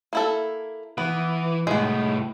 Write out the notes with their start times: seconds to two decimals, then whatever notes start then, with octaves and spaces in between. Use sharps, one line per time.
0.13 A#3 E4 A4
0.98 E3 B3
1.67 C2 A2 G#3 B3